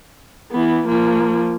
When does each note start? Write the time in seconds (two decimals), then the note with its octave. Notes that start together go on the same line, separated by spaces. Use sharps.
0.52 E3 B3
0.88 F3 A#3